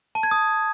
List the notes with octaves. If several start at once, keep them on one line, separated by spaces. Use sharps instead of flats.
A5
G#6
D#6